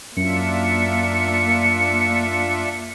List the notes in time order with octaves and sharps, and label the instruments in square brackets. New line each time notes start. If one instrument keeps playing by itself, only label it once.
[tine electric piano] F#2 [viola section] A#3 [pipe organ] D4 F4 E5 [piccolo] C#7